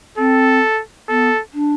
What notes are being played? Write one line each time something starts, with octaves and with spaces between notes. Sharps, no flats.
C4 A4
B3 A4
D4